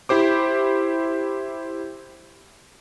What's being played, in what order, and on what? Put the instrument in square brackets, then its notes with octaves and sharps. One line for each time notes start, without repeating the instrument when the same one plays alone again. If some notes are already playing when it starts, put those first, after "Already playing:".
[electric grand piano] E4 G4 C5 D6